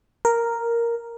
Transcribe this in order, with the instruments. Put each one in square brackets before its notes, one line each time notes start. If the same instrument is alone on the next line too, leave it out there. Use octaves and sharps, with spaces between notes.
[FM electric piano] A#4